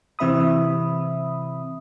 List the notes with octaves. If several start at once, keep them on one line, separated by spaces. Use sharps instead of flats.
C3 E3 C4 E5 B5 D#6